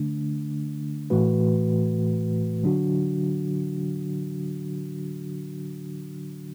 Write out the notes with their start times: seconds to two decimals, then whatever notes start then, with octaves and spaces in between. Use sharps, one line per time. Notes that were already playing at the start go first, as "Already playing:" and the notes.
Already playing: D3 A3 D4
1.10 A2 E3 A3 F#4 B4
2.63 D3 F#3 D4 F#4